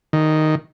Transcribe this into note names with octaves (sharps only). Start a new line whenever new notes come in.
D#3